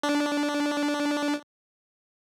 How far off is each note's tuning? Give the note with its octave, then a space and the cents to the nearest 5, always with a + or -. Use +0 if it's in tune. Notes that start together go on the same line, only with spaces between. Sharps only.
D4 -10